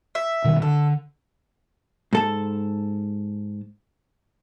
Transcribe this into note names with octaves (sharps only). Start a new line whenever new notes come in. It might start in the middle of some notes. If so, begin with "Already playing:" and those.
E5
B2 D#3 G3
D3 A4
G#2 A4 A5